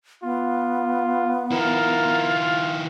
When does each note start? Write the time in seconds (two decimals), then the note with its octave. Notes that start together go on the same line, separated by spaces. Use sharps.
0.23 B3 F4
1.52 D#3 E4 F4 A#4